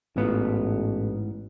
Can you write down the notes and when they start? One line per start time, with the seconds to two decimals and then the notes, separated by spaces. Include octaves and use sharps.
0.17 A1 G#2 B3 F4